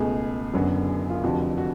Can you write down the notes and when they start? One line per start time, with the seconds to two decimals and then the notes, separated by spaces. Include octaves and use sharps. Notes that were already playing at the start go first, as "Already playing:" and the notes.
Already playing: C#2 B2 A3 G#4
0.54 F#1 F#2 D3 F#3 B3
1.10 F4
1.23 F1 F2 D3 F3 F#4
1.58 F#4